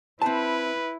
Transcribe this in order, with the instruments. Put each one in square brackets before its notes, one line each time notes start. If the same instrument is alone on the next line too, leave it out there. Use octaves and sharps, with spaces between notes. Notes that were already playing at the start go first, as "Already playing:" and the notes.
[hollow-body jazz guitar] C4 A5 [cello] E4 [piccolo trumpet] B4